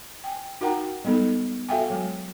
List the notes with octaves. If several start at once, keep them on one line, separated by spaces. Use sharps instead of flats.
G5 G#5
D#4 F#4 A#4 F#5 G5 A#5
G3 G#3 B3 D#4 A4
F#4 A4 E5 F5 G5 G#5
F#3 G#3 G#5